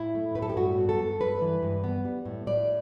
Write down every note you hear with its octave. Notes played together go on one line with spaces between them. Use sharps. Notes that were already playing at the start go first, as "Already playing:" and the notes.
Already playing: A2 E4
A3
A2 B4
A4
G4
G2 F#4
B3
A4
G2
G2 B4
E3
G2
B3
G3
A2
A2 D5